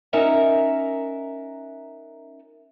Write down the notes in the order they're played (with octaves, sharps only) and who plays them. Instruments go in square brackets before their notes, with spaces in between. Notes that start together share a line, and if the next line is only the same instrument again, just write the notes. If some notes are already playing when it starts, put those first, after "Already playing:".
[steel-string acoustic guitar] C#4 D#4 A#4 E5 F#5